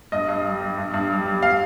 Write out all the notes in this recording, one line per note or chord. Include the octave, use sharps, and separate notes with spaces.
G2 D#5
G2
G3
G3
G2
G2
G3
G3
F5